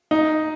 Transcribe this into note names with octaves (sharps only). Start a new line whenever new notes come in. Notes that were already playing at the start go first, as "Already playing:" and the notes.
D#4